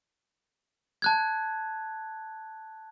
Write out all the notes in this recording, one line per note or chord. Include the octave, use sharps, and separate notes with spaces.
A5 F#6 G#6